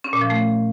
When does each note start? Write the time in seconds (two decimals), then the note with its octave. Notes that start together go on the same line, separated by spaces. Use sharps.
0.04 C#4
0.13 A#2
0.21 F3
0.30 A3